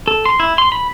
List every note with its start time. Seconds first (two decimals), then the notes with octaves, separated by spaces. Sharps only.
0.08 A4
0.26 C6
0.40 E4
0.58 C6
0.72 B5